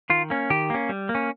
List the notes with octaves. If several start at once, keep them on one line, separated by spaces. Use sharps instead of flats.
D#3 F4
A#3 C#4
D#3 G4
A#3 C#4
G3
A#3
C#4